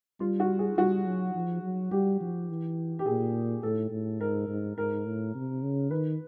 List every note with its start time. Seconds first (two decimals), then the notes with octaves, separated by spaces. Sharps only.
0.20 G3 F4
0.40 F#4
0.59 G#4
0.77 G3 F#4
1.06 F#3
1.35 F3
1.63 F#3
1.91 G3 G4
2.21 F3
2.49 E3
2.99 G4
3.06 A#2 G#4
3.63 A2 A4
3.91 A2
4.20 G#2 A#4
4.48 G#2
4.78 G#2 A#4
5.05 A2
5.35 C3
5.63 C#3
5.91 D#3 B4